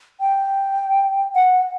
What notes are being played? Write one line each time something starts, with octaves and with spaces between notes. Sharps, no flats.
G5
F#5